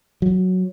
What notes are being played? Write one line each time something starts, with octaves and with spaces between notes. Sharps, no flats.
F#3